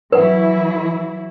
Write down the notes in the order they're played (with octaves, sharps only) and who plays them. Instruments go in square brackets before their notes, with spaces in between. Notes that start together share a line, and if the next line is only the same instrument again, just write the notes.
[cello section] E3 F#3 E4 [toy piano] B4 F#5